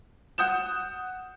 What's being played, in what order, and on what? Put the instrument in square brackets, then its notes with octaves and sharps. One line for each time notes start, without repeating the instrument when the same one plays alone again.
[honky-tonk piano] F#5 D#6 G6 E7